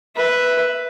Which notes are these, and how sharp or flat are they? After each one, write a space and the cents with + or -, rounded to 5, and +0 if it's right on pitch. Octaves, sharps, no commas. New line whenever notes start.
B4 +0 E5 +0